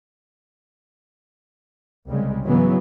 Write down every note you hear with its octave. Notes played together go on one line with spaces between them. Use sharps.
C2 C#3 G3 G#3
G#2 C#3 E3 F#3 B3